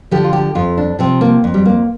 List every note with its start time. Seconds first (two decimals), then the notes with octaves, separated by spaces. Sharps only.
0.11 D3 F3 G4
0.24 F4
0.33 G4
0.55 F2 F4
0.77 D4
0.99 C3 F3 C4
1.21 A#3
1.44 F2
1.54 G3
1.65 A#3